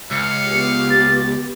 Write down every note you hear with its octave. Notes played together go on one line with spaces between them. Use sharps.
C#2 F5 C#7
B3 G4
A6